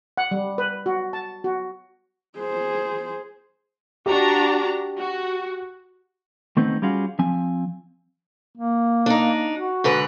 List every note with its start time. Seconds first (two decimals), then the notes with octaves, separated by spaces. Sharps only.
0.17 F#5
0.31 G3
0.58 B4
0.86 F#4
1.13 A5
1.44 F#4
2.38 G#4 C5
4.06 D4 F#4 G4 A#5
4.98 F#4
6.57 D#3 A3 B3 C4 D#4
6.82 G3 C#4 F4 F#4 G#4
7.19 F3 C4 G#5
8.57 A#3
9.06 D4 D#4
9.54 F#4
9.84 G#2 D3 B4